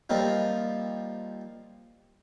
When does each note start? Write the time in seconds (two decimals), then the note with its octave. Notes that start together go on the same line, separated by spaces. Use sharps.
0.10 F3 G3 A#3 C4 D#4 F4